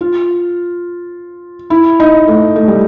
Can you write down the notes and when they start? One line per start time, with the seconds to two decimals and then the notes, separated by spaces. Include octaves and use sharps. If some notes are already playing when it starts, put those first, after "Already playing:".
0.01 F4
1.70 E4
2.00 D#4
2.27 A3
2.56 A3
2.68 G3